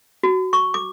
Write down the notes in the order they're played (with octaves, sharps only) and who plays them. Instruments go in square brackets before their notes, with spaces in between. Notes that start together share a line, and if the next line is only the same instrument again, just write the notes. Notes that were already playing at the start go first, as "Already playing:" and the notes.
[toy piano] F#4
C#6
D6